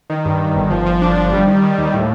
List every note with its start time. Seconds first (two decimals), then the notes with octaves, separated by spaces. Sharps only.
0.10 D#3
0.25 G2
0.41 D#3
0.56 G1
0.70 F3
0.86 F3
1.02 D4
1.17 F3
1.32 G3
1.47 D#3
1.62 D#3
1.78 D#2
1.94 A2